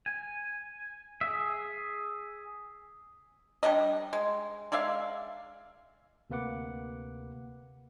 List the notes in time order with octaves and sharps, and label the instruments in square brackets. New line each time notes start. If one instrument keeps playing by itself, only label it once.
[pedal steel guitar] G#5
G#4 E5
[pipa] G3 A3 D4 D#5
G#3
G#3 D5 E5 F5
[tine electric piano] D2 C3 A#3 B4 F#5 D6